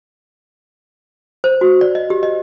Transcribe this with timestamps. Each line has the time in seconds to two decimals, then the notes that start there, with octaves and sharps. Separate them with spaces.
1.44 C5
1.61 F#4
1.81 D5
1.95 D#5
2.10 G4
2.23 D#5